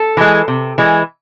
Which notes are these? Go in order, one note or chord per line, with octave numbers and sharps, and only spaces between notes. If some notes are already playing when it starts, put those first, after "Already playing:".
Already playing: A4
E3 G#3
C3
E3 G#3